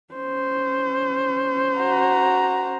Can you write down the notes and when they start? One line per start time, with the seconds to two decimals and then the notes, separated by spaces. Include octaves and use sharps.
0.14 C#4 C5
1.79 F#4 A#5